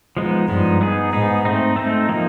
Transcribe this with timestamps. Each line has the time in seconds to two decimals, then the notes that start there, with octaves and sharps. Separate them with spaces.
0.17 F3 G#3 B3 D#4
0.48 G2 F3 G#3 B3 D#4
0.81 B3 D#4 G#4
1.13 G#2 B3 D#4 G#4
1.45 A3 C4 D#4
1.76 A3 C4 D#4
2.09 F3 A#3 D#4